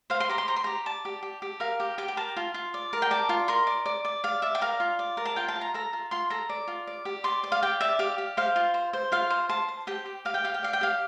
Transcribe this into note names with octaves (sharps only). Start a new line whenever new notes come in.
C5 F5
C6
G4 A#5
C6
C5 A#5
C6
G4 A#5
D5 A5
G4
G4
G4
A#4 F5
G4
G4 G5
G5
A#4 A5
F4
F4
D5
A#4
G5
D5 A5
F4
A#4 C6
D5
D5
D5
D5 F5
D5 E5
G5
A#4 F5
F4
D5
A#4
A5
F4 G5
A5
F4
A#5
A4 A#5
F4
F4 C6
A4 A#5
D5
F4
D5
G4
D5 C6
D5
F5
G4 G5
D5 E5
G4 F5
G4
C5 F5
F4
C5
C5
F4 F5
C5
C5 A5
C5
G4 G5
G4
G4 F5
G5
G4 F5
G5
D5 F5
G5
G4 F5